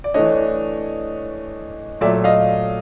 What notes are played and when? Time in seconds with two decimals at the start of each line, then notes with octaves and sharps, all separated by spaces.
0.04 D5
0.14 E3 A3 D4 C#5 D#5
2.01 A#2 F#3 A3 D5 E5
2.24 D#5 F5